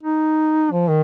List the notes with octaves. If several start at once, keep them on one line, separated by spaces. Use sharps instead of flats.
D#4
F3
D#3